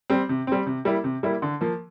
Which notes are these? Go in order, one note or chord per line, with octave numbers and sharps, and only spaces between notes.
G3 C4
C3
G3 C4
C3
G3 A#3 E4
C3
G3 A#3 E4
D3
F3 A#3